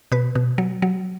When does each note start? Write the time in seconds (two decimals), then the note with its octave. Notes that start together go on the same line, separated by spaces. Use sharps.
0.12 B2 B4
0.35 B2
0.58 F#3
0.82 F#3